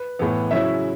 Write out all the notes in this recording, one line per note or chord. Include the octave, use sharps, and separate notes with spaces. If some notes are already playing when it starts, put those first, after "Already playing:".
Already playing: B4
A2 E3 B3
C#3 F#3 C#4 E4 E5